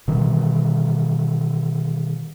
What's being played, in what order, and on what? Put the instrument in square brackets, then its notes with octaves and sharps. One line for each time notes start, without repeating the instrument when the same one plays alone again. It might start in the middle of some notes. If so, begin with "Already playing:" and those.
[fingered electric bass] B2 D#3 E3 G3